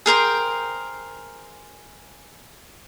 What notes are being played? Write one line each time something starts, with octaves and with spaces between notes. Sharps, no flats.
G#4 A#4 C5 G5